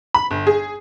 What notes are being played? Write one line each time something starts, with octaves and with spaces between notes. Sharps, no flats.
B5
G1
G#4